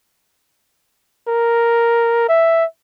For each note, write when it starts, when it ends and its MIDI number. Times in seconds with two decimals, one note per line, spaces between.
1.28 2.25 70
2.28 2.65 76